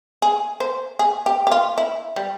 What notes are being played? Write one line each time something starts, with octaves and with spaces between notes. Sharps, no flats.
G#4
C5
G#4
G4
G4
F4
E4
G3